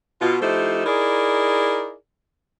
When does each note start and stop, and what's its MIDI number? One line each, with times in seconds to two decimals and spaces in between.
0.21 0.37 47
0.21 0.37 65
0.42 0.84 53
0.42 0.84 57
0.42 0.84 63
0.42 0.84 64
0.42 0.84 67
0.42 0.84 72
0.86 1.93 63
0.86 1.93 64
0.86 1.93 68
0.86 1.93 70
0.86 1.93 74